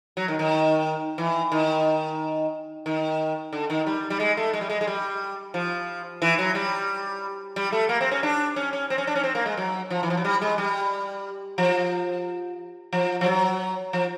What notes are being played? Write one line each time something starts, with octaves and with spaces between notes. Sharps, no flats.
F#3
D#3
D#3
E3
D#3
D#3
D3
D#3
G3
G3
G#3
A3
G#3
G3
G#3
G#3
G3
F3
E3
F#3
G3
G3
A3
A#3
C4
C#4
D4
C#4
C#4
C4
C#4
D4
C#4
C4
A#3
G#3
F#3
F3
E3
F3
F#3
G3
G#3
G3
F3
F3
F3
F#3
F3